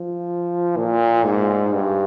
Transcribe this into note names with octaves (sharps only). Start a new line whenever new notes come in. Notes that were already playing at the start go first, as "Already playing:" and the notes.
Already playing: F3
A#2
G#2
G2